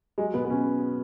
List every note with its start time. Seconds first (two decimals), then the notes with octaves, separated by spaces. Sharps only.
0.18 F#3 G#3
0.34 B2 B3
0.45 B3
0.50 B2 C#4